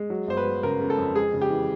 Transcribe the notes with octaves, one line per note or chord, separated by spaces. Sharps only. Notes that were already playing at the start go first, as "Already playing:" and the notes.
Already playing: G#3
F#3
G1 C5
B4
F#3
C#3 A#4
C#3
A4
F2
G#3 G#4
C#3
G4
E3